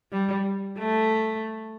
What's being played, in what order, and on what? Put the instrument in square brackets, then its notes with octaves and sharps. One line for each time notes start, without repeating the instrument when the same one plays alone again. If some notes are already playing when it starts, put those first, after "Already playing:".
[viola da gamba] G3
A3